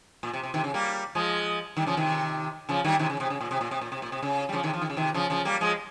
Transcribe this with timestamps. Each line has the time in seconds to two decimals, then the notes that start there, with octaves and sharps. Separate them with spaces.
0.23 A#2
0.33 C3
0.43 C3
0.54 C3 D#3
0.64 C#3
0.74 G3 A#3
1.15 F3 G#3
1.77 D#3 G3
1.87 C#3 F3
1.97 C3 D#3
2.69 C#3 F3
2.84 D#3 G3
2.99 C3 D#3
3.10 C#3
3.20 C3
3.30 C#3
3.41 A#2
3.51 C3
3.61 A#2
3.71 C3
3.81 A#2
3.92 C3
4.02 A#2
4.12 C3
4.23 C#3
4.49 G3
4.53 C#3 F3
4.63 C3 D#3
4.74 F3
4.81 D#3
4.90 C#3
4.97 C3 D#3
5.14 C#3 F3
5.30 C#3 F3
5.45 G3 A#3
5.61 F3 G#3